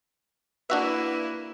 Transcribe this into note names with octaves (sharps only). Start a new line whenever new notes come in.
A#3 D4 E4 F#4 B4 E5